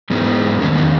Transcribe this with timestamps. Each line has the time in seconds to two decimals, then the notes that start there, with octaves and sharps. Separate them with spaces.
0.10 G#2 E3 G#3 B3
0.60 E2 D#3 A#3 C#4
0.77 B3